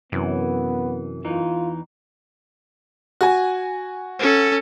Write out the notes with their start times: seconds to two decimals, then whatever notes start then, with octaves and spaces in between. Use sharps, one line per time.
0.12 F#2 C3 E3 B3
1.24 E2 E3 D#4 F4
3.21 F#4 G#5
4.19 C#4 A4